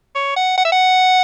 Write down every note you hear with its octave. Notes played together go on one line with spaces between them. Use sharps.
C#5
F#5
F#5
E5
F#5